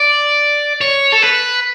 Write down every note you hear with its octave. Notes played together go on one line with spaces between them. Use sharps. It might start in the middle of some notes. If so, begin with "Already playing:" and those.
Already playing: D5
C#5
A4
B4